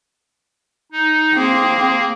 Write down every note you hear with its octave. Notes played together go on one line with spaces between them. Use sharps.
D#4
A#3 C4 G#4